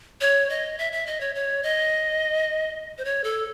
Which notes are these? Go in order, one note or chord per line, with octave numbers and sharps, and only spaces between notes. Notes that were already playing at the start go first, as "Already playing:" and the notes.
C#5
D#5
E5
E5
D#5
C#5
C#5
D#5
C5
C#5
A4